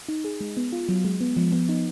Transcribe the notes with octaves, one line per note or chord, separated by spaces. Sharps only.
D#4
G#4
G#3
B3
F4
F#3
G#3
B3
F3
B3
D#4